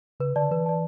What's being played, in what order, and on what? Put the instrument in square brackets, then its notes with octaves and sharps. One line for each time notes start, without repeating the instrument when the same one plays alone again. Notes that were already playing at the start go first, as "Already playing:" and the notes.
[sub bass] C#3 [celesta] B4
[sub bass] D3 [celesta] D5 A5
[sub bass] E3 [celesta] B4
[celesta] D5 A5